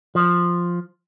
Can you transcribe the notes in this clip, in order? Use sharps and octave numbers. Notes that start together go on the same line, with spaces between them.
F3